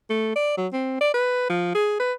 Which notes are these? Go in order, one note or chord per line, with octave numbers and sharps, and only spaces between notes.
A3
D5
F#3
C4
D5
B4
F3
G#4
B4